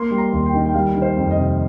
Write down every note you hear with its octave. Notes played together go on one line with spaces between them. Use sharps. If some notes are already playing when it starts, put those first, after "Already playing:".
Already playing: A#3 C6
G3
A#5
D#2
G5
D#3
G5
G3 F5
D#3
C5
F2
D#5
C3